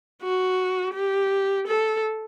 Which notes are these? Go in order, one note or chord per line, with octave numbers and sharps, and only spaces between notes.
F#4
G4
A4